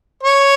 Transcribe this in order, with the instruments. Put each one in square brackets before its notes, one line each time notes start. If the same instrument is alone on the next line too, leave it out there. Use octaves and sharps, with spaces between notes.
[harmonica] C#5